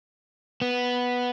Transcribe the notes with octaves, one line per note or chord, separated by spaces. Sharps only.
B3